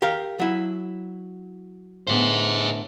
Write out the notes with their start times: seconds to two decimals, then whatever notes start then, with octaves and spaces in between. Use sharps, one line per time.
0.02 G4 A#4 F5
0.40 F#3 E4
2.07 A2 D3 B3 G#4 C5